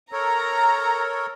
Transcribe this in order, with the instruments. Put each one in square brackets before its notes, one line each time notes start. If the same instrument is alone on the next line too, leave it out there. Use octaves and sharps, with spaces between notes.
[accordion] A4 A#4 C#5 [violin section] A#5